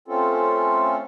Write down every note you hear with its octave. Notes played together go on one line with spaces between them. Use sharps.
A3 C4 C#4 F4 A4